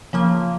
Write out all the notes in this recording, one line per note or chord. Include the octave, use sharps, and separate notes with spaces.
C#3 F3 A#3